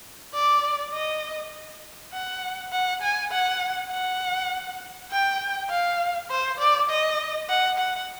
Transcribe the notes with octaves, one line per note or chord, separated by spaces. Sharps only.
D5
D#5
F#5
F#5
G#5
F#5
F#5
G5
F5
C5
D5
D#5
F#5
F#5